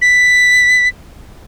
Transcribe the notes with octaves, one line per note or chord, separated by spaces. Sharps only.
B6